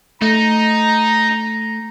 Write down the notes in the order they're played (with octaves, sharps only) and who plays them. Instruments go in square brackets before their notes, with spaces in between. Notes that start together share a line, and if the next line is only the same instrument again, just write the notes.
[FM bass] A3 [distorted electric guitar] D#4 [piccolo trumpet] A#5